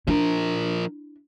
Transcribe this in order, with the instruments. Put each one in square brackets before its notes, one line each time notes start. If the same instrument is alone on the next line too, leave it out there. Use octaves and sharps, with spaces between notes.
[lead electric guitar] F3 A#4 [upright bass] D4 E4